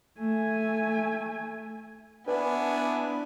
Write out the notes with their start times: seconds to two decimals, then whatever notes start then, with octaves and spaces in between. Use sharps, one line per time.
0.19 A3 G#5
2.28 B3 D4 E4 B4 G#5